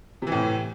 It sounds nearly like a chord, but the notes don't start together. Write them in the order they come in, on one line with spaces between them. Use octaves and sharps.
C3 E3 A2